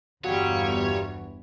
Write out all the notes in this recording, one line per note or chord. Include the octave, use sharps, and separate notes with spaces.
G1 E2 A#2 E3 G3 F#4 C#5 F#5